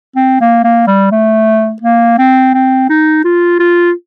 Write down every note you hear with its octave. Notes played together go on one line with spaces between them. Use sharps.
C4
A#3
A#3
G3
A3
A#3
C4
C4
D#4
F4
F4